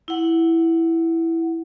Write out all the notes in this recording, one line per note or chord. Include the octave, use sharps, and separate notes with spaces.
E4 F#5